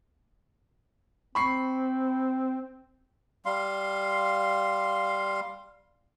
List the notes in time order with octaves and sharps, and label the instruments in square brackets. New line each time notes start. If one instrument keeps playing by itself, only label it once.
[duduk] C4 [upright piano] B5 C#6 C7
[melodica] G3 F5 C6